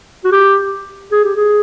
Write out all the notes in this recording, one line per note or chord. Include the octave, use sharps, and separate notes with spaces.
F#4
G4
G#4
G4
G#4